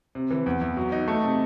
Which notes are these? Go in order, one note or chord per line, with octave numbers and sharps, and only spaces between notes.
C3
E3
E2
E2
F#3
D#4
A3
C3